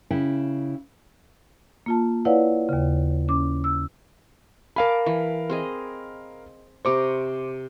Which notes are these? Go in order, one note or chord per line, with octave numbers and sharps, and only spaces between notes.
C#3 E4 G5
A#3 F4 A5
E4 B4 C#5 D5 F5 F#5
D#2 C#3
C#4 D6
E6
A#4 F5 G#5 A5 B5 D6
E3
C4 G#4 D#5
C3 C5 A#5 C#6 D6